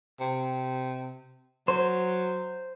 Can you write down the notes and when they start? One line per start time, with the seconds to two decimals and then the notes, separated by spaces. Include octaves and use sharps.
0.20 C3
1.68 F#3 C5